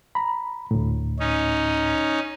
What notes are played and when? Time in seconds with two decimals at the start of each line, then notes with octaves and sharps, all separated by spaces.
0.15 A#5 B5
0.71 D2 A2
1.20 C#4 D#4